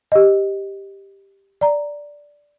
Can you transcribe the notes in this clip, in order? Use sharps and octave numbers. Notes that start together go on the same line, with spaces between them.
G4 D#5
D5 A#5